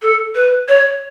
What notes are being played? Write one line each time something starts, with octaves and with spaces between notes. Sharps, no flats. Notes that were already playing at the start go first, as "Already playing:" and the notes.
A4
B4
C#5